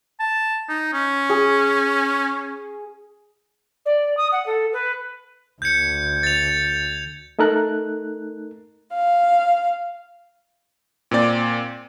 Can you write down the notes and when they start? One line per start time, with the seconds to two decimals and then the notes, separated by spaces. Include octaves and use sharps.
0.20 A5
0.68 D#4
0.93 C#4
1.30 G#4
3.85 D5
4.17 D#6
4.32 F#5
4.46 A4
4.72 B4
5.62 D2 G6 G#6 C#7
6.23 A6 F7
7.39 A3 D#4 A4 A#4 F#6
8.94 F5
11.11 A#2 C4 D5